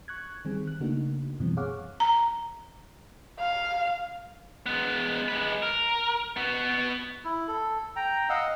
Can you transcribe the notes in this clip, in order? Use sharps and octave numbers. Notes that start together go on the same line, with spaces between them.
C#6 F#6 G#6
D#3 G3 C4 G#4
F#6
C#3 A3 A#3 D4 D#4 F#4
F#2 B2 E3 F3 G3 C4
G#4 C#5 F5 F#5 D6
A#5
F5
G#3 B3
G#3 B4
A#4
B3 F#4
E4
A4
G5 A#5
D#5 F5 F#5 E6